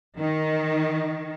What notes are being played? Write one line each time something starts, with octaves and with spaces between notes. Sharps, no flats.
D#3